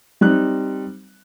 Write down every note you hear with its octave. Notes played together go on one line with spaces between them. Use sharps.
G3 C4 D#4 F#6